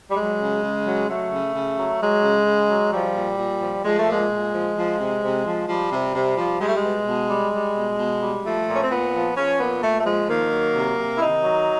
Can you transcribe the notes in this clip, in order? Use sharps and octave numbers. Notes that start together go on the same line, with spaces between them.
G3
F#3 G#3
C#3
C#3
F#3
F#3 A3
C#3
C#3
F#3
F#3 G#3
C#3
C#3
F#3
F3 G3
A#2
A#2
F3
F3 G#3
A3
A#2 G#3
A#2
F3
F3
C3
C3
F3
F3 G3
C3
C3
F3
G3 G#3
A3
G#3
B2
B2
G3
G3
B2
B2
G3
F3 A3
A#2
C#4
C4
A#2 B3
F3
F3 C#4
A#2 B3
A#2 A3
A3
F3 G#3
D#3 A#3
F#3
C3
C3
E4
D#3 D#4
F#3